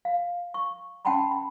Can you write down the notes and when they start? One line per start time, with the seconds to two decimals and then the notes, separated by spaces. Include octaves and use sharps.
0.05 F5
0.54 C#6
1.05 C#4 F#5 G5 A5 B5 C6
1.31 B5